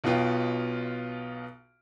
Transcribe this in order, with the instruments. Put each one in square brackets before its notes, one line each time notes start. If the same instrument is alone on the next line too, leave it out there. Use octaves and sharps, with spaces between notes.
[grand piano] B1 B2 B3 F4 G5